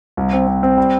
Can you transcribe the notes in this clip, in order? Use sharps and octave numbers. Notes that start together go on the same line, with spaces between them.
C2
C4
C4
C4
G3